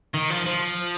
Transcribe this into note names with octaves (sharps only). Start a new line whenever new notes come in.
D#3
F3
F3